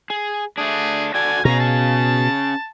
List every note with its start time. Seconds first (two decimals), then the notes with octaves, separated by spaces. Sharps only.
0.10 G#4
0.57 A3 D4 G#4
1.14 F#4 A4 D5 G#5
1.45 B2 C#4 G#4 A#5
1.60 A5